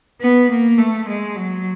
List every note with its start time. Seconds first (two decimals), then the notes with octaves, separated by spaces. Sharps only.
0.21 B3
0.50 A#3
0.79 A3
1.08 G#3
1.36 F#3